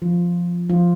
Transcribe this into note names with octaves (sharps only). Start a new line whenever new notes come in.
F3 F4
F3 F4